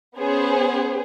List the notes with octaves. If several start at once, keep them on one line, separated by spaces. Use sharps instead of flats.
B3 C#4 G#4 C5